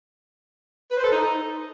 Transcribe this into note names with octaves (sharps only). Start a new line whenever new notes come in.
B4
C5
A4
D#4